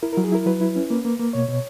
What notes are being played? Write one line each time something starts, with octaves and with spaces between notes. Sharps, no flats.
E4 A#4
F#3 A#4
G#4
E4 A#4
F#3 B4
E4
C#4
A#3
A#3
A#3
B2 C#5
B2